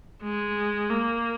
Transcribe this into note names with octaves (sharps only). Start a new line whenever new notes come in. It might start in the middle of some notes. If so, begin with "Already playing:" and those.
G#3
A#3